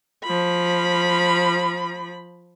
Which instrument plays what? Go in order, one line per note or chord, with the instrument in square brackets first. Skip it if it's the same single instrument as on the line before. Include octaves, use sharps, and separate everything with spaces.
[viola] F3 B5